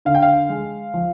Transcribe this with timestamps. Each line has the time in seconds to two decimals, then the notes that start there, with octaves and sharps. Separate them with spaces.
0.05 D3 F5
0.15 G5
0.22 F5
0.50 G#3
0.94 F3